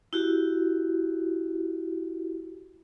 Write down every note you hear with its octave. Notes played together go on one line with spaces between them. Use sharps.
E4 F#4 G4